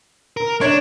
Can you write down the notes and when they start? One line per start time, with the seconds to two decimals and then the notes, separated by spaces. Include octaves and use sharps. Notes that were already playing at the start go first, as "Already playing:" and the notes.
0.37 A#4
0.61 D4 C#5